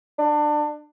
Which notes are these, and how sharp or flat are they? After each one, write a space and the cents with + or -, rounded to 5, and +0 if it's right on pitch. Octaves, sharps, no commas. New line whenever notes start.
D4 +25